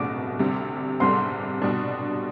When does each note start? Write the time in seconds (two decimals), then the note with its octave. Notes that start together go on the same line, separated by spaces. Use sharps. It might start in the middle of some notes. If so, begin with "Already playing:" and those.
Already playing: C2 B2 A3 D6
0.39 D2 C3 G3
1.00 C2 C3 G3 C6
1.62 B2 G3 D4